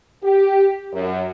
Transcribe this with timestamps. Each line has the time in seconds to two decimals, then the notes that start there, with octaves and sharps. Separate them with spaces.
0.22 G4
0.92 F#2